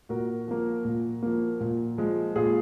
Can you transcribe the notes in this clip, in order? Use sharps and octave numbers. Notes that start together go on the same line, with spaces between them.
A#2 F#4 A#4
F3 A#3
A#2
F3 A#3
A#2
F3 G#3
A#2 F4 G#4